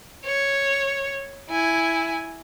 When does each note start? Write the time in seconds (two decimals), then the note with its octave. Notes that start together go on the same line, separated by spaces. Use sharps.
0.25 C#5
1.50 E4 G#5